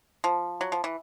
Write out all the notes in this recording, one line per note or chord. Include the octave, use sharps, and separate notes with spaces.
F3
F#3
F3
E3